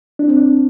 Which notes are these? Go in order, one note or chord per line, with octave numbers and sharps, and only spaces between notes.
D4
C4
D4